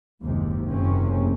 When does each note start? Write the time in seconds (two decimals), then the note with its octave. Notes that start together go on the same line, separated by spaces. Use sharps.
0.22 F#1 D#2 G#2 C3
0.68 F#1 E2 C3 C4 C#4